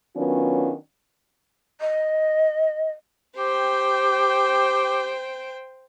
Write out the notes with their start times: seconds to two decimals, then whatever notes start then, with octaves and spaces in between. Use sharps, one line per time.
0.16 D#3 F#3 B3 C#4 D4 F4
1.81 D#5
3.37 G4 C5 G5